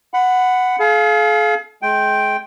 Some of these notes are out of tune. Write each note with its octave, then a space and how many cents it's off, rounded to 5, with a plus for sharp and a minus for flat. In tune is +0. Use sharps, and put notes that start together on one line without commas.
F#5 +0 B5 +20
G#4 +45 F5 +0
G#3 +35 G5 -5